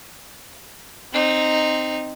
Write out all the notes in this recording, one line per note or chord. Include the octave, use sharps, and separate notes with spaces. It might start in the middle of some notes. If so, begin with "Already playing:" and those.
C4 D#4